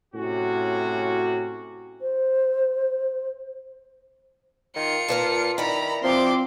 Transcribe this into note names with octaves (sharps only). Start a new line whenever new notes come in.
A2 C3 C#4 F#4
C5
D#3 F4 C#7
A#2 A#4 B4 A5
D#3 E4 D5 A#5 B5
F3 C4 C6 D6